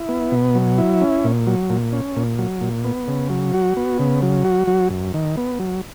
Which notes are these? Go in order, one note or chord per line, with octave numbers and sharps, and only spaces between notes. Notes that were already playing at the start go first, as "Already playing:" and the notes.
Already playing: E4
B3
B2
F#3
E4
C#4
A#2
F#3
A#2
C#4
A#2
F#3
A#2
B3
C#3
F#3
F#4
B3
C#3
F#3
F#4
F#3
F#2
D#3
B3
F#3